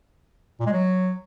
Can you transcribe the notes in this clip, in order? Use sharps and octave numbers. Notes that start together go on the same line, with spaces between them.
A#2
G#3
F#3